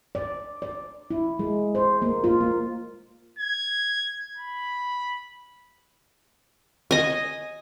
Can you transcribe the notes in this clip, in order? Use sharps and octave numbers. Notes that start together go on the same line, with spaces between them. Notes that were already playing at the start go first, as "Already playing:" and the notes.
D5
D5
E4
G#3
C5
A#3
F4
A#3
G#6
B5
D#5 G#5